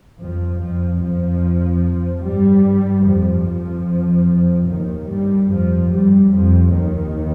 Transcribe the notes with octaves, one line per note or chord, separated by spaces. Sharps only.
F2 F3
F2 F3
F2 F3
G2 G3
F2 F3
F2 F3
D#2 D#3
G2 G3
F2 F3
G2 G3
F2 F3
D#2 D#3